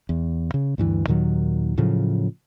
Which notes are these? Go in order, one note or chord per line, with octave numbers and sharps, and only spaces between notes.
E2
C#3
D2 G2 E3
D#2 A#2 D#3 F#3
A2 C#3 F3 F#3